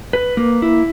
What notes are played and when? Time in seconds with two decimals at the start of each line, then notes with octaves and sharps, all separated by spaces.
0.13 B4
0.37 A#3
0.62 E4